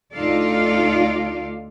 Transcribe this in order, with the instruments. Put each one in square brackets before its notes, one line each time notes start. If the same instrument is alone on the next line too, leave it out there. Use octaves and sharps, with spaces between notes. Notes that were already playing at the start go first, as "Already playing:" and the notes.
[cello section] D2 D#4 F4 A4 D5 F5